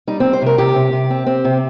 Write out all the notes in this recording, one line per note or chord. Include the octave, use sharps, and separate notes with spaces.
G3 D#4
G3 C4
C5
C3 A#4
C3 G4
C3
C3
C4
C4
C3